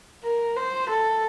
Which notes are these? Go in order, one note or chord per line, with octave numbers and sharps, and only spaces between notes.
A#4
C5
A4